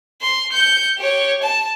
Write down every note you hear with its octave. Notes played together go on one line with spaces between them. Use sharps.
C6
G6 C#7
G4 C#5
A5